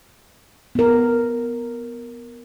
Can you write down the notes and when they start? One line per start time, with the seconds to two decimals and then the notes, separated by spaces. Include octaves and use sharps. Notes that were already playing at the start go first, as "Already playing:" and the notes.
0.75 B3 A#4